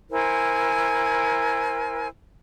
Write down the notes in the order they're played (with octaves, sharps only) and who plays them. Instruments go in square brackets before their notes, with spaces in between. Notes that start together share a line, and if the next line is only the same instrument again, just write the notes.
[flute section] E4 A#4 C5 G#5